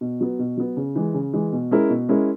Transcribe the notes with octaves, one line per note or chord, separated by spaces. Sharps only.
B2
F#3 B3
B2
F#3 B3
C#3
E3 G#3
C#3
E3 G#3
B2
G#3 C#4 E4 A#4
B2
G#3 C#4 E4 A#4